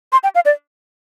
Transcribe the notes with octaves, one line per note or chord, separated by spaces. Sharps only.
C6
G5
F5
D5